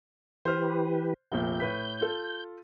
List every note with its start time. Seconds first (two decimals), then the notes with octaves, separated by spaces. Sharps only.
0.45 E3 G4 B4 C5 F6
1.32 F1 A#1 A#2 G6
1.60 A2 B4 B6
2.01 F4 A4